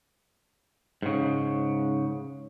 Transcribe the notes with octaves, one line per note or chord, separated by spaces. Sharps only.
G#2 C#3